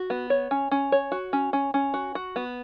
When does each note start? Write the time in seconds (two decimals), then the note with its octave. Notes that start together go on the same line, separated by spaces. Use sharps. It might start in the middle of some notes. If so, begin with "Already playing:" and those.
Already playing: F#4
0.10 B3
0.30 C#5
0.51 C#4
0.71 C#4
0.92 C#5
1.12 F#4
1.33 C#4
1.53 C#4
1.74 C#4
1.94 F#4
2.15 F#4
2.36 B3